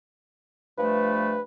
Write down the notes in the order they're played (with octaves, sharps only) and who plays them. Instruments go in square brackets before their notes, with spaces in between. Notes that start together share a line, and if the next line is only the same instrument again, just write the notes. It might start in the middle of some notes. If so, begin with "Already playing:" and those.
[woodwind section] G2 F3 A3 [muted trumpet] B4